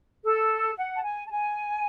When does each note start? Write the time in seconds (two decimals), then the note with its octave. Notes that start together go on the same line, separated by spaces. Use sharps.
0.24 A4
0.77 F#5
0.96 A5
1.04 G#5
1.26 A5
1.31 G#5